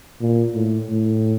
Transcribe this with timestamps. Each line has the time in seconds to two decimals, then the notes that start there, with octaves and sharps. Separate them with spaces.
0.21 A#2
0.54 A2
0.89 A2